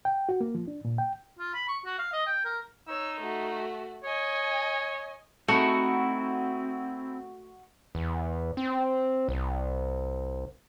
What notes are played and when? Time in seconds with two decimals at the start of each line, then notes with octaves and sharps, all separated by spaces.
0.05 G5
0.29 F#4
0.41 A#3
0.55 F3
0.68 D4
0.85 A#2
0.98 G5
1.39 F4
1.54 B5
1.68 C#6
1.86 F#4
1.98 F5
2.13 D#5
2.26 G5
2.45 A#4
2.88 D#4 C#5 E6
3.21 A3 F#4
4.05 C#5 D#5 G#5
5.48 A3 C4 D#4 E4 F#4
7.95 E2
8.57 C4
9.28 C2